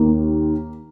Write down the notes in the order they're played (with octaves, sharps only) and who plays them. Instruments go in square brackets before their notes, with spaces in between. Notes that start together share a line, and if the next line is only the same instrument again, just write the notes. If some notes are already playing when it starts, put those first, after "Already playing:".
Already playing: [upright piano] D#2 D#3 A#3